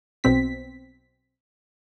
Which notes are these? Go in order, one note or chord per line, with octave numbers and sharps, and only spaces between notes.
B1 B2 C4 B6